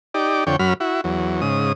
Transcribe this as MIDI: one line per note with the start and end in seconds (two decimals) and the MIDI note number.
0.14 0.44 63
0.14 0.44 67
0.14 0.44 74
0.47 0.56 41
0.47 0.56 50
0.47 0.56 73
0.47 0.56 79
0.59 0.74 42
0.59 0.74 54
0.59 0.74 83
0.59 0.74 89
0.80 1.01 64
0.80 1.01 66
1.04 1.41 40
1.04 1.41 54
1.41 1.72 44
1.41 1.72 49
1.41 1.72 87